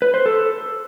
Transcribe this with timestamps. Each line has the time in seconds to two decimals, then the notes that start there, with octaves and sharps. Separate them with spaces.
0.02 B4
0.14 C5
0.26 A4